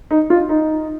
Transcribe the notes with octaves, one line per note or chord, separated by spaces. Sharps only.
D#4
F4
D#4